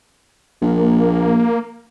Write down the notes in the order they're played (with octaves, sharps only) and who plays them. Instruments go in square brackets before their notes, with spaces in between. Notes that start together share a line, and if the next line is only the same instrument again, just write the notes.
[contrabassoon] A#1 [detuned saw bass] A#3